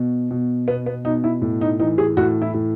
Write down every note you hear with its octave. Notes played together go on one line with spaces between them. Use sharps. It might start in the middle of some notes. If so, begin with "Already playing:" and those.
Already playing: B2
B2
B2 B3
B3
B2 D#4
E4
A2
D#4
E3 D#4
G#4
A2 F#4
E4
A2